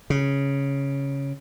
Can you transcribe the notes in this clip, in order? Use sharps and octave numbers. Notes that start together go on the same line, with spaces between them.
C#3